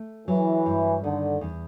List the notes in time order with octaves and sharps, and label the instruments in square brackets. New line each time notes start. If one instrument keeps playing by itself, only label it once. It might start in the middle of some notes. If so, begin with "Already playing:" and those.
Already playing: [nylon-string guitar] A3
[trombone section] E3 [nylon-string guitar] F#3
[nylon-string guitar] G2
[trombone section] D3 [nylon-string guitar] D#3
[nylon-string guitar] E2